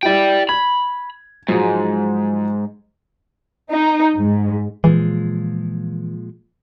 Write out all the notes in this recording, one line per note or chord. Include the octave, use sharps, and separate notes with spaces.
E4 G4 D5 G5
B5 G#6
G#2 F3 F#3 G#3
D#4
G#2
A#2 E3 F3 G#3